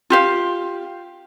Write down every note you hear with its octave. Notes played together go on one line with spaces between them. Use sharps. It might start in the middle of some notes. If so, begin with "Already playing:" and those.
F4 G4 F5